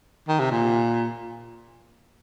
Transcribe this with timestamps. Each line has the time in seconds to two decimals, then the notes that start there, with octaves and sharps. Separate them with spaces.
0.28 D#3
0.40 C3
0.51 A#2